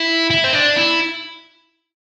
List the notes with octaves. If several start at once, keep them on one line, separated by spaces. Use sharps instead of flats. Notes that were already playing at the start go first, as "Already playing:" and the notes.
Already playing: E4
E4
C4
D4
E4